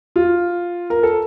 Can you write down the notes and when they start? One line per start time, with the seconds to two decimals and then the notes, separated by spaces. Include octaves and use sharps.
0.16 F4
0.90 A#4
1.03 A4